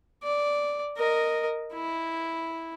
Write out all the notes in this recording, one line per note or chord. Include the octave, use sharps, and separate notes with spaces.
D5
A#4 D#5
E4